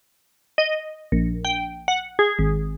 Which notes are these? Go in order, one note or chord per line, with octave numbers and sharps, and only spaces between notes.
D#5
A#1
G5
F#5
G#4
G#1